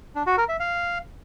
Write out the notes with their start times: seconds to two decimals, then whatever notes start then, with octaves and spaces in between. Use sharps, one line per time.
0.15 D4
0.27 F#4
0.38 A#4
0.49 E5
0.60 F5